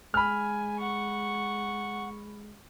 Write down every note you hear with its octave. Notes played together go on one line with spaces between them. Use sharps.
G#3 G#5 B5 F6
F#5 C#6